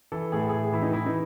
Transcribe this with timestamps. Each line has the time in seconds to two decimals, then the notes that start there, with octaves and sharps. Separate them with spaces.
0.12 E3 A4
0.32 A2 G#4
0.42 A4
0.49 A2 G#4
0.72 E3 E4
0.82 D#4
0.93 E3 E4
1.06 D#4